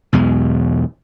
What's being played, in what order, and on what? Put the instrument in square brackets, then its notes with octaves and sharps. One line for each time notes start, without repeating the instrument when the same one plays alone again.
[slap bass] B1 E2 B2 G#3